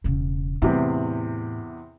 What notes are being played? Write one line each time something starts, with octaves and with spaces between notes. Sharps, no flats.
E1 C#3
E2 A2 C3